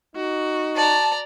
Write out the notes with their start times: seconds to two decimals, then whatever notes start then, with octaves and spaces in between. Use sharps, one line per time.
0.16 D#4 F#4
0.76 D5 A5 A#5